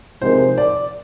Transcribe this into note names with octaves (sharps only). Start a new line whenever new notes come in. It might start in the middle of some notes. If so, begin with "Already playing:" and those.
C3 F3 G#3 D#4 A#4 C5
D5